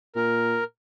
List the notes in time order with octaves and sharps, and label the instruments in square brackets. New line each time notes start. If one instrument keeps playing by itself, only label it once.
[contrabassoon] A#2 [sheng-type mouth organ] A#4